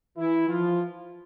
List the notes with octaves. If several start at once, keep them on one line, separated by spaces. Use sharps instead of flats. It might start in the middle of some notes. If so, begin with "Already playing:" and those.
E3 E4
F3 F4